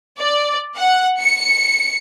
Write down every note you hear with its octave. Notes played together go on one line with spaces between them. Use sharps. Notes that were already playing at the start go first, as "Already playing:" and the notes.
D5
F#5
C#7